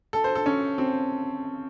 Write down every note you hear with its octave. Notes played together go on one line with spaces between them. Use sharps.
A4
C5
A4
C#4
C4